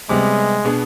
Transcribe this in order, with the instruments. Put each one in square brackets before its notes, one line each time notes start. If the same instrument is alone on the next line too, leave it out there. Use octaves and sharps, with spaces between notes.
[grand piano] C3 G3 B3 [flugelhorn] G#3
[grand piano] B2 B3 D4 G#4